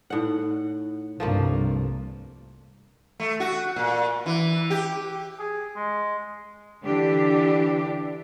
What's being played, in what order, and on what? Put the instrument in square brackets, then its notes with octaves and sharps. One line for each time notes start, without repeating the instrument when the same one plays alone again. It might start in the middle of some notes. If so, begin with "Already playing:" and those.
[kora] A2 F#5 [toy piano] D#4 D5
[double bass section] C2 G2 [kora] F3 A3 A#3
[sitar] A3
F#4
A#2
E3
G4
[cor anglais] G#4
G#3
[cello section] D3 E3 D4 G4